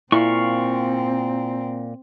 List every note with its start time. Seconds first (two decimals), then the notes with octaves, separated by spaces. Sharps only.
0.12 A#2 C4 E4 F5 C#6